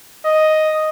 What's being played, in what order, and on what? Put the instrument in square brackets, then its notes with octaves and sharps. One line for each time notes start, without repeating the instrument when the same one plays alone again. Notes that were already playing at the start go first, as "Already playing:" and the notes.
[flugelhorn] D#5